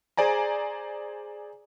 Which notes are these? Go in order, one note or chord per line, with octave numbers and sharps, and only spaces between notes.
G#4 C5 D5 G#5 A#5